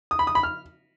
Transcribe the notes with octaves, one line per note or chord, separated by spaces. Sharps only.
D#6
B5
D#6
B5
F6